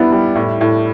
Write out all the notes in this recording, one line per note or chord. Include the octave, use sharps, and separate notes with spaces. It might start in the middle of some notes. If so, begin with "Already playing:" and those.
Already playing: G3 B3 D4 E4
G3
A2
A2